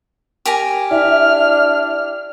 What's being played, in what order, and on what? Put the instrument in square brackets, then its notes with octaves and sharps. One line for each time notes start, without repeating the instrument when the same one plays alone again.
[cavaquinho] G4 A#4 G#5
[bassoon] D4 [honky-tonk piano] E4 [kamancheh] F6